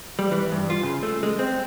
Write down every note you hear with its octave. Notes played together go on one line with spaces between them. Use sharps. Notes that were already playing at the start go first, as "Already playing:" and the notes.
G3
E3
G2
F4
C#3
A3
G#3
C4